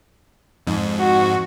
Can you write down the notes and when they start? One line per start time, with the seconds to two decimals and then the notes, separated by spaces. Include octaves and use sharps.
0.67 F2 G#2
0.99 F#4